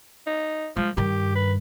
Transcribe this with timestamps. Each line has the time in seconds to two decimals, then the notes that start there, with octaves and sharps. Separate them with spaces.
0.27 D#4
0.77 F3 G#3
0.97 G2 D#3 G4
1.35 B4